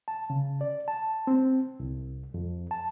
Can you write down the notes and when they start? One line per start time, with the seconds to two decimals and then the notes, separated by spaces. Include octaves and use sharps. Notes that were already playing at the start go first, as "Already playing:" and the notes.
0.08 A5
0.30 C#3
0.61 D5
0.88 A5
1.27 C4
1.80 C2
2.34 F2
2.71 A5